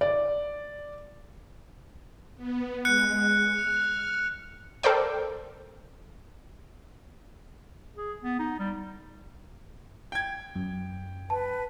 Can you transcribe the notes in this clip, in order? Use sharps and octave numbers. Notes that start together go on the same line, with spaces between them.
D5
B3
G#3 F#6 C#7
F6
A4 A#4 C5 D5 G5
G#4
B3
D#4
G3
G5 G#6
F#2
B4 A5